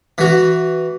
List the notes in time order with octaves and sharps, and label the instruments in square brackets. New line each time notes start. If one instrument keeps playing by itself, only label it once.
[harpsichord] E3 F#4